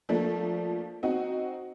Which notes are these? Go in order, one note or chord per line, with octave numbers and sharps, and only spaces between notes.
F3 A3 A#3 D4
C4 D#4 F#4